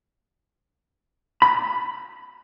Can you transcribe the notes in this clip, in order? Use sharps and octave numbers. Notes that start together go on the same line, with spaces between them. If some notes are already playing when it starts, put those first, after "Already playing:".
B5